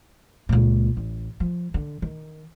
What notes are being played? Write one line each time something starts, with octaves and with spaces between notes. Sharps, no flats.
C#2 A#2
A1
F3
D3
D#3